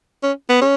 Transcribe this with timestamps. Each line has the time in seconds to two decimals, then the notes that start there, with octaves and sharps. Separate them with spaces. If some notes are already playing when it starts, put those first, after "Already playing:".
0.23 C#4
0.49 B3
0.62 C#4